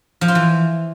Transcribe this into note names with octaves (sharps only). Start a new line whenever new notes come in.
F3
F4
E3